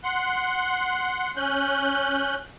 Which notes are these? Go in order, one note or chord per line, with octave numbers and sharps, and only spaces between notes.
F#5 C6
C#4 F#6 G6